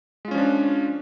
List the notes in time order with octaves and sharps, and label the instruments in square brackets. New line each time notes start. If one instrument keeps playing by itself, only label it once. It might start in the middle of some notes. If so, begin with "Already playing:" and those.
[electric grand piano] G#3
F4
C#4
F3
D4